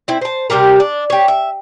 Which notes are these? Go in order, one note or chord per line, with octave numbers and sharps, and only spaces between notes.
C4 E4
C5 A5
C3 G3 G4 A#4
D4
G4 C#5
E5